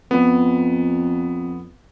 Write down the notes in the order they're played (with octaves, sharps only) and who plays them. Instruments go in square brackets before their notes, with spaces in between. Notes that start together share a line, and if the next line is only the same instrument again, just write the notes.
[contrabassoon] F2 [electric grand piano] B3